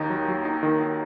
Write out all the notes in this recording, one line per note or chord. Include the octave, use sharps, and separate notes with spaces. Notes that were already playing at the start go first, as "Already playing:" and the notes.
Already playing: D#2 D#3 D#4
F#3
F#3
D#4
D#3
D#3